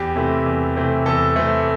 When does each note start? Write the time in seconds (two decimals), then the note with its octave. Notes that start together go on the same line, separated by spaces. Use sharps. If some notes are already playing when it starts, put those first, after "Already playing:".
Already playing: E2 G4
0.15 C3 E3 A3 C4
0.46 E2
0.77 C3 E3 A3 C4
1.06 E2 A4
1.36 C3 E3 A3 C4